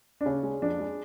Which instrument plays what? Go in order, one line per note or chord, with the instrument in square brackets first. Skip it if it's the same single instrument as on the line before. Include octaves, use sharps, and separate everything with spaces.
[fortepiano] D4
C#3 C#4
G#3
F2 D4
G#3